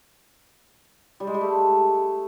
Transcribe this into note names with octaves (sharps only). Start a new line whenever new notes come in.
G3
G#3
G3
A3